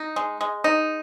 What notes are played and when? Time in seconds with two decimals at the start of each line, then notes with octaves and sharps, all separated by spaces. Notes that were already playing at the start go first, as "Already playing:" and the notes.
Already playing: D#4
0.16 G#3
0.41 G#3
0.64 D#4